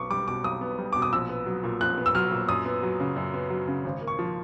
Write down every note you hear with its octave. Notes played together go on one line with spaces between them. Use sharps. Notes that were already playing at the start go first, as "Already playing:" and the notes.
Already playing: B1 B3 C#6 D6
G3 D6
B2 D6
B1 D#6
B3
G3
B2 D6
D#6
A#1 E6
B3
F#3
A#2
A#1 F#6
B3
E6
F#3 F6
A#2
F#2 D#6
B3
F#3
C#3
F#2
B3
F#3
C#3
G#1
A#3
C#6
F3